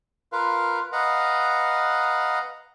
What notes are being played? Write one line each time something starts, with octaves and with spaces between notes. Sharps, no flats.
F4 A#4 B4 F5
B4 D#5 F5 F#5 A#5